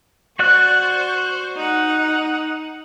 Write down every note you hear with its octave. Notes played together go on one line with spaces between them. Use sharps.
F#4 C5 D5 C#6 F#6
D#4 F#5